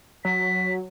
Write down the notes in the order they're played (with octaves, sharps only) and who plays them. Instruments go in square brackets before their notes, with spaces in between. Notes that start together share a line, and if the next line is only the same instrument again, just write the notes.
[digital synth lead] F#3 [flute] B6